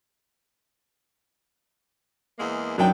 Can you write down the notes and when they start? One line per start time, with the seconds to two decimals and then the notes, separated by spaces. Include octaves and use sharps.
2.39 E2 G#3 A#3
2.78 F#2 D#3 F#3 D4 G5